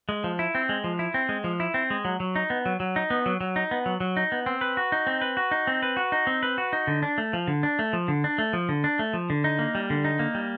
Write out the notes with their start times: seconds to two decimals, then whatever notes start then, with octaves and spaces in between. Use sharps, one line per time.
0.09 G#3
0.24 F3
0.39 E4
0.55 C4
0.69 G#3
0.84 F3
0.99 E4
1.14 C4
1.29 G#3
1.44 F3
1.60 E4
1.74 C4
1.90 G#3
2.05 F#3
2.20 F#3
2.36 D#4
2.50 B3
2.66 F#3
2.80 F#3
2.96 D#4
3.10 B3
3.26 F#3
3.41 F#3
3.56 D#4
3.71 B3
3.86 F#3
4.00 F#3
4.17 D#4
4.32 B3
4.46 C4
4.61 B4
4.77 F#4
4.92 D#4
5.07 C4
5.21 B4
5.37 F#4
5.51 D#4
5.67 C4
5.83 B4
5.97 F#4
6.12 D#4
6.27 C4
6.43 B4
6.58 F#4
6.73 D#4
6.87 D3
7.03 D4
7.18 A3
7.33 F3
7.48 D3
7.63 D4
7.79 A3
7.93 F3
8.08 D3
8.24 D4
8.38 A3
8.53 F3
8.69 D3
8.84 D4
8.99 A3
9.13 F3
9.30 D3
9.44 D#4
9.59 A#3
9.75 G3
9.90 D3
10.04 D#4
10.19 A#3
10.35 G3